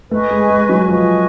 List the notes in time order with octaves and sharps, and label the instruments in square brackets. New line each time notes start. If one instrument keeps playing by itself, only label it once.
[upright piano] A3 [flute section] B4 D#5 G#5 C#6
[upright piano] G#3
G#3
F#3
[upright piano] F3 [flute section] B4 D#5 G#5 C#6